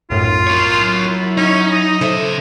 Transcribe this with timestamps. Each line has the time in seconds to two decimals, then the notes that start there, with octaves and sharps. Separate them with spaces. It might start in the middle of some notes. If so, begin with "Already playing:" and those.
0.10 B1 F#2 A2 F4
0.47 A#4 C#5
0.80 F#3 E4
1.37 C#4 D#4 C#5
1.71 D#5
2.01 C#3 A4 C5 E5